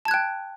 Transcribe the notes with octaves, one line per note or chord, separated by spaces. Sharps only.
G5 A5 F#6 G#6